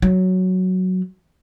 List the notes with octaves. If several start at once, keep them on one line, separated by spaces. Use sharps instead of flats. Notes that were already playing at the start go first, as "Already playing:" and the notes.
F#3